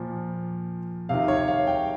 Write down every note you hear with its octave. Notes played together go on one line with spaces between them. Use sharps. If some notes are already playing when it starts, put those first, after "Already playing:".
Already playing: A#2 F3
C3 D#3 F5
C#5
F5
G5